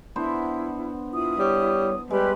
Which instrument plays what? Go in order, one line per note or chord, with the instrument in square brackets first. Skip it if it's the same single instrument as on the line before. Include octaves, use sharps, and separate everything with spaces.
[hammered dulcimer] B3 D4 C5 [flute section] E4 F#5
[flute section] E4 D#6 [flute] F4
[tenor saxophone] G3 [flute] C#5
[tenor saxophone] G3 [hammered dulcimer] G#3 [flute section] G4 B5 [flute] B4